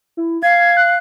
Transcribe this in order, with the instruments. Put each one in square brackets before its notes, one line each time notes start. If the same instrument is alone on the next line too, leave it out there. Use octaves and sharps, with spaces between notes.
[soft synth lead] E4
[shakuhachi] F5 [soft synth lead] G#6
[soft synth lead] F#6